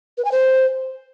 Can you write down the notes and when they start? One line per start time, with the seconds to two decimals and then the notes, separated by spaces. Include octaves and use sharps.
0.18 B4
0.25 G#5
0.32 C5